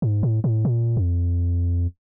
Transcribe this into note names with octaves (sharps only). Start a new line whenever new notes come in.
G#2
A2
A2
A#2
F2